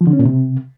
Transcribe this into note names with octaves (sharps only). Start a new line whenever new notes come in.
F3
D3
C#4
A#2
C3